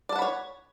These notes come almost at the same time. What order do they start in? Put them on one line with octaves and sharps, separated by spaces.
D5 A5 F#5 B5 C#5